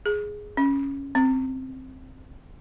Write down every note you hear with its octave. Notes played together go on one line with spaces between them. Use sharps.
G#4
C#4
C4